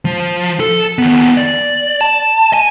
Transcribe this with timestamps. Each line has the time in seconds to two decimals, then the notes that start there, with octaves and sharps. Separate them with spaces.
0.05 F3
0.60 A4
0.98 D#2 B3
1.37 D5
2.01 A5
2.53 G#5